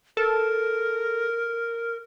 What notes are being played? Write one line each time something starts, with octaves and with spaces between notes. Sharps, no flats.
A4 A#4